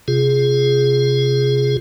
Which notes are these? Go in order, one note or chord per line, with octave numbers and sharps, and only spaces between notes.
C3 F4 G#4